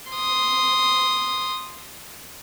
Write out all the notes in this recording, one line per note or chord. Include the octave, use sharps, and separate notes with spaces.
C6 D#6